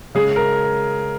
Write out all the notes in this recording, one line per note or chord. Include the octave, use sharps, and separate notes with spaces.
C#3 G#3 G#4
A#4